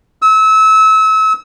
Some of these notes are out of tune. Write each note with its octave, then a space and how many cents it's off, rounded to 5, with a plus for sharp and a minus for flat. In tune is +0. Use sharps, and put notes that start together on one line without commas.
E6 -30